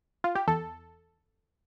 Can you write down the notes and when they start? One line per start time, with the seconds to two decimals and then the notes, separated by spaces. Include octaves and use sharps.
0.24 F4
0.35 G4
0.48 E2 A4